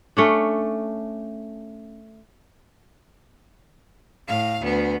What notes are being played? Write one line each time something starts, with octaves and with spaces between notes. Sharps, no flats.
A3 C#4 D4
A2 F5
D2 B3